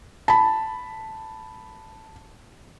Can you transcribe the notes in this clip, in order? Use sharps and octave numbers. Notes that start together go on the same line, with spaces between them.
A5 B5